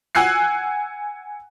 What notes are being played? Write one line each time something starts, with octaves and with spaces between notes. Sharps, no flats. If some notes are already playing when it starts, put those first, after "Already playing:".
F#5 G#5 E6 F#6 C7